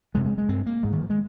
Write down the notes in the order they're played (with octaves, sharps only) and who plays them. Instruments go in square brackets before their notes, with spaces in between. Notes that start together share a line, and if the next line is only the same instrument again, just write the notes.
[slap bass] F2 C3 G#3
G#3
G#3
G2 C4
A#3
G#2 G#3
D#3
F3
G#3